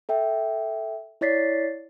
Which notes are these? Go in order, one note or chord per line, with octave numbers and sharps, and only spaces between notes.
A4 E5 G5
E4 C#5 D5 A6 B6 C7